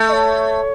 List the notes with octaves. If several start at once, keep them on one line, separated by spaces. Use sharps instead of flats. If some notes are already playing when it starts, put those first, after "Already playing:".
Already playing: A3
D#5
C#5